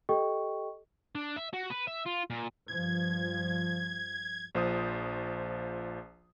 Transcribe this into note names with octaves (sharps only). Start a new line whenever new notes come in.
G4 A4 D#5 G5 C#6
D4
E5
F#4
B4
E5
F4
A#2
G2 F3 G#6
A#1 F3 C5 D#6